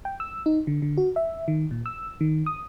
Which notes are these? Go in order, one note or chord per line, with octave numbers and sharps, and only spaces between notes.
G5
E6
D#4
D3
D3
F#4
E5
D#3
A#2
E6
D#3
D#6